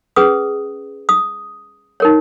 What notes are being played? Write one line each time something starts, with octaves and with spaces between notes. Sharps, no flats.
C#4 G#4 B4 D#6
D#6
D#4 A#4 C#5